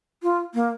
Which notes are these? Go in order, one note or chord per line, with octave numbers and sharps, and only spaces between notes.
F4
A#3